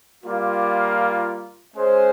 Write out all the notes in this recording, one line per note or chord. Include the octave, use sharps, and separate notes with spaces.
G3 A#3 F4
G#3 C#4 G#4 C5